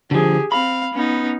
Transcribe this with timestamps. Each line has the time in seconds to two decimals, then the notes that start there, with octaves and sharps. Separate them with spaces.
0.11 D3 F3 G4 G#4
0.52 C4 F5 B5
0.94 B3 C#4 D#4